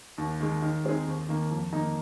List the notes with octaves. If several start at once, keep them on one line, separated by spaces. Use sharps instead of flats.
D#2
D#3 G#3
D#3
G#3 C4 D#4 G#4
D#2
D#3 A#3
F2
D#3 A#3 D#4